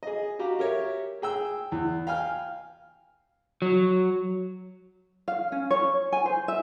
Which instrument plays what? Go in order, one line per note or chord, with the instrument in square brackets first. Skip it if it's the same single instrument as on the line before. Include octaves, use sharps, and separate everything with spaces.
[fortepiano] G#4 D#5
F#4 G4 F5 A#5
G4 A#4 C#5 E5
G#4 G5 E6
E2
F5 G5 G#5 F6
[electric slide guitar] F#3
[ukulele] F5
C#4
C#5
G#5
C5
E5